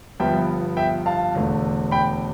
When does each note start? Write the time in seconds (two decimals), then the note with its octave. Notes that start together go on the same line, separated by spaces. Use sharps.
0.20 G1 G2 F3 B3 E5 G5
0.77 E5 G5
1.06 F5 A5
1.35 E1 E2 D3 A3
1.91 G5 B5